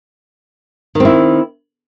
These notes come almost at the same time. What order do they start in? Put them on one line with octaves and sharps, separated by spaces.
D#3 C4 E4